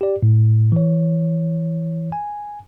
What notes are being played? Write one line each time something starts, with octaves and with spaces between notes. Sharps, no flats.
G4 D5
A2
E3 C#5
G#5